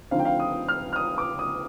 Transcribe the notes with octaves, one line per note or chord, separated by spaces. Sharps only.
D2 D3 F3 C4 D#4 F5
G5
F5
D#6
F6
F6
D#6
D6
D#6